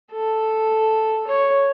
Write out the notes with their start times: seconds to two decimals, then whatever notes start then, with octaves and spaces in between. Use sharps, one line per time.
0.12 A4
1.27 C#5